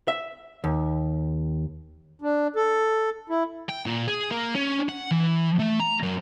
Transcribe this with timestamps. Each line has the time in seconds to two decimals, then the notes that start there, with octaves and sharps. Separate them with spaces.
0.08 E5
0.64 D#2
2.22 D4
2.56 A4
3.29 E4
3.69 G5
3.86 A#2
4.08 G#4
4.31 A#3
4.55 C#4
4.89 F#5
5.11 E3
5.60 A3
5.80 A#5
6.03 F#2